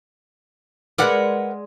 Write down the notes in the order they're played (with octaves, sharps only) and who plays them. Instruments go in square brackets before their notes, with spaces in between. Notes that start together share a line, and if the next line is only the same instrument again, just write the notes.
[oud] G#3 D5 [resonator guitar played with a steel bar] A#4 B4 F#5